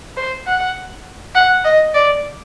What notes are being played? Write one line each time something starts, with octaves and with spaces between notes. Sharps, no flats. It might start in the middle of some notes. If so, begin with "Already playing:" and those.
C5
F#5
F#5
D#5
D5